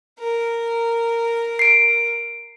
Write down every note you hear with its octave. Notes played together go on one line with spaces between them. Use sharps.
A#4
C7 D7